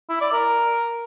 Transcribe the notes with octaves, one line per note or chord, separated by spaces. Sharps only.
E4
D5
A#4